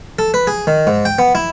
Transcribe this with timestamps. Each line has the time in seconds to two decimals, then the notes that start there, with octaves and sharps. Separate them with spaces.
0.19 A4
0.34 B4
0.47 G#4
0.67 D#3
0.87 G#2
1.05 G5
1.19 B3
1.35 E4